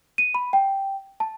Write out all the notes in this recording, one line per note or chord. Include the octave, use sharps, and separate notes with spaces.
D#7
B5
G5
A5